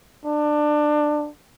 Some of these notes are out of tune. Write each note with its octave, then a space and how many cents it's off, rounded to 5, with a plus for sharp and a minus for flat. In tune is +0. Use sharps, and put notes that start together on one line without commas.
D4 +20